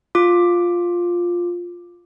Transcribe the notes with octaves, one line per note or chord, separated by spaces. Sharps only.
F4 D6